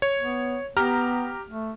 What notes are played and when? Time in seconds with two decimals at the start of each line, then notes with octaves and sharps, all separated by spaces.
0.02 C#5
0.21 B3
0.77 B3 G4 A#5 F6
1.50 A3